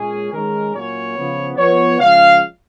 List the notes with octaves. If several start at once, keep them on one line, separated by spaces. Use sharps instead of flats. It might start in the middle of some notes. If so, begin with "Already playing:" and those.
Already playing: A#2 G#3 C#4 G#4
D#3 G#3 C#4 A#4
A#2 F#3 A#3 C#4 C#5
C#3 F3 B3
F3 B3 C#5
C#3 F3 G#3 C#4 F5